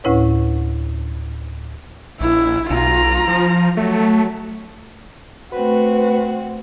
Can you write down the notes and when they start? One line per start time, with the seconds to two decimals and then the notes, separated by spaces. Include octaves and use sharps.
0.04 D2 A2 C#4 E4 B4 C#5
2.21 A#1 E4
2.70 B1 F4 A#5
3.27 F3
3.77 F#3 A3
5.52 A3 C4 F#4 B4